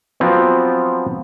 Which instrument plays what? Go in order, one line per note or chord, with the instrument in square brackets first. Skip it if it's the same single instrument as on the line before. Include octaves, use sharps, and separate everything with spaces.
[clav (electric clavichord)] F3 F#3 B3 C4